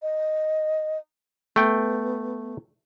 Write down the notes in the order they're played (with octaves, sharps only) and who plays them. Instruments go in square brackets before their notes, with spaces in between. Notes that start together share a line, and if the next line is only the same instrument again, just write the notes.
[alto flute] D#5
[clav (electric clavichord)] A3 G5 [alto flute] B3